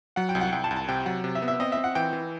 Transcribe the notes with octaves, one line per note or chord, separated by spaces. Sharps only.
F#3 F#5
G5
C2
F#5
C2 G5
A5
C2
A5
C3 G5
F#3 F#5
C3
E5
B3
E5
C4 D#5
E5
C4
F#5
E3 G5
E3